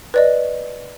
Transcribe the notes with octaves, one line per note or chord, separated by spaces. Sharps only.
B4 D5 D#5